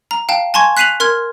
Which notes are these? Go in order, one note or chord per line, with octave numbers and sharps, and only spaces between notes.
A#5
F5 G5 A5
G#5 A5 C6 C#6 G#6
F#6 B6 C7 D#7 F7 F#7
A#4 C6 F6 G#6